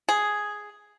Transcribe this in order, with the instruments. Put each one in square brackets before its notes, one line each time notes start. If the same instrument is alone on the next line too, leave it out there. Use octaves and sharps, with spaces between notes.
[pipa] G#4